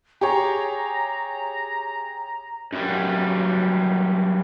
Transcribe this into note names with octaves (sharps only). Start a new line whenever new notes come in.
G4 G#4 C#5 A#5
F#2 G3